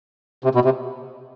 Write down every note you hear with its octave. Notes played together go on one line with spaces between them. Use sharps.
C3
B2
C3